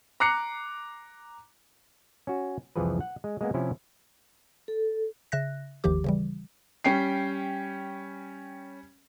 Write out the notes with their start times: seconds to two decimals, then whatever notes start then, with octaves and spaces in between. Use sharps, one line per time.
0.20 A#5 D6 F#6 C7 C#7
2.27 C#4 F#4
2.76 C2 F2 E3 F3 G#4 B4
3.01 F#5
3.24 G#3
3.41 G#3 A#3 B3
3.54 C3 F3 C#4 E4 G4
4.68 A4
5.32 C#3 E5 F#6 A#6
5.84 G1 D#2 D#3 F3 G4 D6
6.04 C#3 E3 G3
6.84 G3 C#4 G5 C7